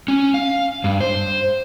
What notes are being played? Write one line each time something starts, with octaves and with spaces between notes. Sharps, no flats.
C#4
F5
G2
C5